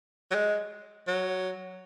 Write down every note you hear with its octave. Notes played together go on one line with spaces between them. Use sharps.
F#3
G#3
F#3